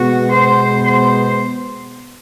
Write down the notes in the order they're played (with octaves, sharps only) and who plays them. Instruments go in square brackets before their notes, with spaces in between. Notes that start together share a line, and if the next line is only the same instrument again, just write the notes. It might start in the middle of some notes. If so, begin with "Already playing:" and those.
Already playing: [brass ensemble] B2 G#3 B3 [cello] F#4
[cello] C5
C5